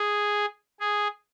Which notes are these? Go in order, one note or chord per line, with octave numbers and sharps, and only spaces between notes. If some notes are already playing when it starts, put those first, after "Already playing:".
Already playing: G#4
G#4